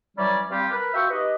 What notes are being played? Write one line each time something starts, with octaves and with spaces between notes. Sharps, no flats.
E3 F#3 G3 C#4 D5
G2 G3 C4 F4 G4
A#4 B4
F4 F#4 E5 G5 C#6
D#4 G4 B4 D#5